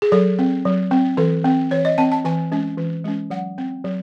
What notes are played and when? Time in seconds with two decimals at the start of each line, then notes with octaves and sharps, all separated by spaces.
0.02 G#4
0.12 F#3 A4
0.39 C4
0.65 F#3
0.91 C4
1.17 E3 A4
1.45 C4
1.71 E3 C#5
1.85 D#5
1.98 C4 A5
2.12 A5
2.25 E3 G#5
2.51 G#3 C#4
2.78 E3
3.04 G#3 C#4
3.30 F#3 F#5
3.58 C4
3.84 F#3